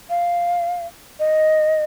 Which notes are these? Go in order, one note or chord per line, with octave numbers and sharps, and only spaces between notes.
F5
D#5